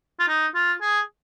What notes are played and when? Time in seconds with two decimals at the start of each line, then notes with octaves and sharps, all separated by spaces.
0.19 F4
0.28 D#4
0.54 F4
0.81 G#4